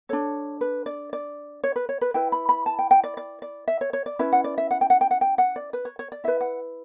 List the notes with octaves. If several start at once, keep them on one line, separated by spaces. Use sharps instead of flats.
D4 A4 C#5
B4
D5
D5
C#5
B4
C#5
B4
E4 B4 G5
B5
B5
A5
G5
G5
D5
D5
D5
E5
C#5
C#5
D5
C#4 E4 B4 E5
F#5
D5
E5
F#5
G5
F#5
G5
F#5
G5
F#5
D5
B4
C#5
C#5
D5
E4 B4 E5
F#5